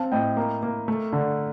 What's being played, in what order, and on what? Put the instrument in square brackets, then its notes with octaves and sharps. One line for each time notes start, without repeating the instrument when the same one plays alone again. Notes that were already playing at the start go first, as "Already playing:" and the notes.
Already playing: [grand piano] C4 F5 A5
A2 D#5 G5
A#3
A#3
A3
D3